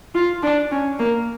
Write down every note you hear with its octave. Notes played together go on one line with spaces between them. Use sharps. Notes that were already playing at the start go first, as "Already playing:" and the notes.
F4
D4
C#4
A#3